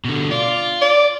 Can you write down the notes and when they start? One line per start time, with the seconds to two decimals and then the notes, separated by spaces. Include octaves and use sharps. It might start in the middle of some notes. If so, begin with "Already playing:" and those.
0.04 B2 D3
0.31 F4 D5
0.82 D5